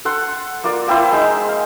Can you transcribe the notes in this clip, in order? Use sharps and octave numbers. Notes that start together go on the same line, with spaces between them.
A4 F#5 C6
A#3 F4 D5
A#3 C4 E4 C5
G#3 D#4
F5